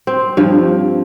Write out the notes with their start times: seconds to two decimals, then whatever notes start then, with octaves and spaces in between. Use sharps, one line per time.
0.07 C4
0.37 G2 F3